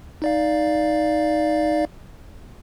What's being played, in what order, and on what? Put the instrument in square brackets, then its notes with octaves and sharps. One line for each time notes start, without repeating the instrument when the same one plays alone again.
[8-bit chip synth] D#4 D5 F5